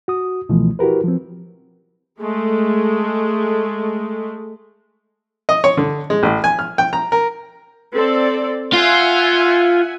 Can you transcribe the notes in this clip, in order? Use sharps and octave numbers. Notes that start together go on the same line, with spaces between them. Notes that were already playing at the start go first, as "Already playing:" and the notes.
F#4 D#6
C#2 B2 E3 F3 A3
E4 F#4 G4 A#4 B4
F3 C4
G#3 A3
D#5
C#5
D3
G#3
A1
G#5
F6
G5
A#5
A#4
C4 A4 D5
F4 E5 F#5 G#5